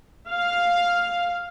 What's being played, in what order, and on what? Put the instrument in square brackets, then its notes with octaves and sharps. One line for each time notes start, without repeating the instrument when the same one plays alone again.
[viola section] F5